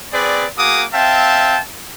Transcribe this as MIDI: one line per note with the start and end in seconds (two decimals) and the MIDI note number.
0.12 0.47 60
0.12 0.47 68
0.12 0.47 71
0.12 0.47 74
0.58 0.84 58
0.58 0.84 66
0.58 0.84 68
0.58 0.84 86
0.58 0.84 87
0.94 1.60 60
0.94 1.60 76
0.94 1.60 77
0.94 1.60 79
0.94 1.60 81